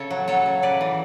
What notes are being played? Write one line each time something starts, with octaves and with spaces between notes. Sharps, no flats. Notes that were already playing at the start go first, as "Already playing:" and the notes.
Already playing: C#3 A4 C#5
F#3
F#3 A4 C#5
C#3
C#3 B4 D5
E3